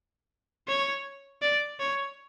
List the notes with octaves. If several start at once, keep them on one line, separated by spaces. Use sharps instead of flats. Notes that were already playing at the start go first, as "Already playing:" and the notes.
C#5
D5
C#5